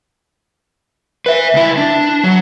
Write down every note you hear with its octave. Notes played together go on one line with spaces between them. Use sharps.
B4 E5
C#2 E4
D4
F#3